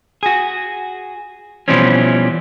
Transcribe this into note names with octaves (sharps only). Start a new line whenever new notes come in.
F#4 G#4
B2 E3 F3 G3 C4 C#4